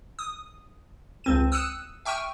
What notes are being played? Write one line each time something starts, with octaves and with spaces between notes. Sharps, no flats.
D#6
C#2 C4 D#7
D#6 E6 F#6 C#7 D#7 E7
E5 G5 C#6 F6 D#7